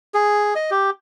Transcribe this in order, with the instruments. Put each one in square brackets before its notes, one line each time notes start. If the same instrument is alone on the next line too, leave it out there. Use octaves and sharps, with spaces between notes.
[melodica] G#4
D#5
G4